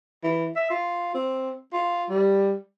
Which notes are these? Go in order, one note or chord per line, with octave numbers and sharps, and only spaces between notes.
E3
E5
F4
C4
F4
G3